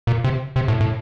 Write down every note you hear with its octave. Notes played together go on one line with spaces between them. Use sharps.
A#2
C3
C3
A2
A2